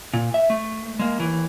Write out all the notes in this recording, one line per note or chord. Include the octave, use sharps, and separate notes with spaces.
A#2
E5
A3
G#3 A#3
D#2 E3